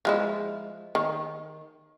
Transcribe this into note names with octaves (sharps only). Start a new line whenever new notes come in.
F3 G#3 E4
D#3